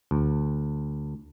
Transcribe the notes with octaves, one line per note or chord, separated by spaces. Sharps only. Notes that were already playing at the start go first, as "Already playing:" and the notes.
D2